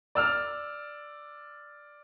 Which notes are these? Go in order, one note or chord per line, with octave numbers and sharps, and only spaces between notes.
D5 E6 F6